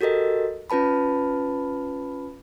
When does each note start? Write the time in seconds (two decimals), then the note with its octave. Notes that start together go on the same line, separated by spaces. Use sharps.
0.01 F#4 G4 A4 A#4 D#5
0.70 C#4 F4 B4 A5 B5